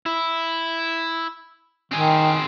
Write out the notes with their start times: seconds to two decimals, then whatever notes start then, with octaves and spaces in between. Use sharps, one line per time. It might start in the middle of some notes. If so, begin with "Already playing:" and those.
0.06 E4
1.92 D#3 C4 G#4